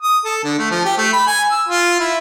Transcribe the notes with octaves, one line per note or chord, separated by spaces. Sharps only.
D#6
A4
D3
A3
F3
G4
A3
B5
G#5
E6
F4
E4